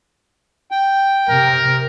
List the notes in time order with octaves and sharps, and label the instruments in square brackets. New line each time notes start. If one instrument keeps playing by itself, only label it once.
[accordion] G5
[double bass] C3 [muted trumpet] A#4